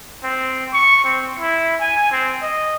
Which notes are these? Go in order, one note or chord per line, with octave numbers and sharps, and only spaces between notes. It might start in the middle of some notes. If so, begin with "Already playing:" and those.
C4
C#6
C4
E4
G#5
C4
D#5